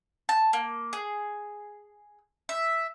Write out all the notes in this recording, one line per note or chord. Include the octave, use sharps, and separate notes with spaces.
A5
A#3
G#4
E5